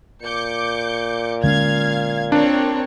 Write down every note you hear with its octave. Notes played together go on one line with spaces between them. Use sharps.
A#2 D6 G6 C#7
D3 G#3 C#4 F5 F6 G#6
C4 D4 A#4 C#5